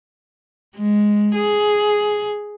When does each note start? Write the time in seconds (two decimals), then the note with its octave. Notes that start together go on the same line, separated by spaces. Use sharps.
0.76 G#3
1.35 G#4